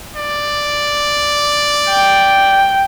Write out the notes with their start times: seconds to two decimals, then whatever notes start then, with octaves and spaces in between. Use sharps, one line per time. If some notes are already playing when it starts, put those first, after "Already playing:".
0.17 D5
1.90 G5